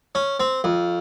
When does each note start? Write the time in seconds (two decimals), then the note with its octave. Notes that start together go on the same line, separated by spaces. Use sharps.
0.15 C#4
0.40 C4
0.64 F2